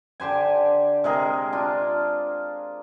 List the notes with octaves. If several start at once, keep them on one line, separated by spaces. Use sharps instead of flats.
D3 G4 C5 G#5
C3 G#3 G#4 A#4
D4 F4